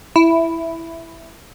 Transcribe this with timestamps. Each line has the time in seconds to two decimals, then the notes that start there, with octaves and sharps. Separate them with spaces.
0.16 E4